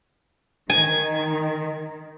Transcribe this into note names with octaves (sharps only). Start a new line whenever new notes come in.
D#3 G#5